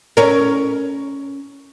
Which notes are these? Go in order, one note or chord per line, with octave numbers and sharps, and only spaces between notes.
C#4 A#4